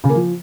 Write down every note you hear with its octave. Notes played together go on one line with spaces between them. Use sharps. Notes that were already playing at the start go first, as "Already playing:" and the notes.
C#3
A#3
F3